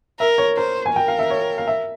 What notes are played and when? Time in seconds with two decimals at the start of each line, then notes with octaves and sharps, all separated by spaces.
0.19 A#4 E5
0.38 C#5
0.57 A#4 C5
0.86 G#5
0.94 A#4 G5
1.08 F5
1.19 E5
1.30 C#5
1.58 F5
1.67 E5